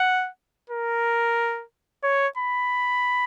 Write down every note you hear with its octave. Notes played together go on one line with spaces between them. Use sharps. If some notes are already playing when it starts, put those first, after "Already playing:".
Already playing: F#5
A#4
C#5
B5